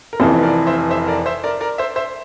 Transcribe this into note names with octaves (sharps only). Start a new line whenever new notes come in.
A#4
F1 F2 E3 A4 C5
A#4 D5
C5 E5
C5 E5
A#4 D5
C5 E5
A#4 D5
A#4 D5
C5 E5
C5 E5